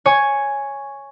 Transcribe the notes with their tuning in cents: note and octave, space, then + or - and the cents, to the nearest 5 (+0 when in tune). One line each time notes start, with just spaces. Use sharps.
C#5 +0 G#5 +0